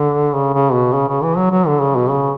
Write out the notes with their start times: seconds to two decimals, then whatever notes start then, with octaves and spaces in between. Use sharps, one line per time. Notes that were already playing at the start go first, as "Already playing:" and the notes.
Already playing: D3
0.34 C#3
0.54 C#3
0.73 B2
0.93 C#3
1.08 C#3
1.23 E3
1.37 F#3
1.51 F#3
1.67 D3
1.80 C#3
1.96 B2
2.10 C#3